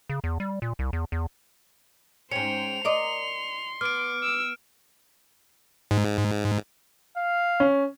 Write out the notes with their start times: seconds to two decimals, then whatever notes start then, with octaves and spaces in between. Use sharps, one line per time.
0.10 C#3
0.24 E2
0.40 G3
0.62 A#2
0.79 C2
0.93 E2
1.12 E2
2.32 G#2 C#4 C5 G5 C#7 F7
2.85 A#4 D5 D#5 C6
3.81 B3 D6 F6 D7
4.23 E6
5.91 G#2
7.17 F5
7.60 C#4